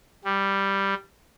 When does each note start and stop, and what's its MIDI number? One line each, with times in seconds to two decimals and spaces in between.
0.25 0.94 55